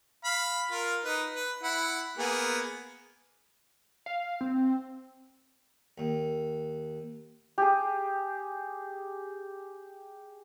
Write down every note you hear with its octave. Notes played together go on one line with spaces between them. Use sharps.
F5 B5
F4 A#4
D#4 B4
B4
E4 F#5 B5
A#3 B3 G#4
F5
C4
D#2
G4 G#4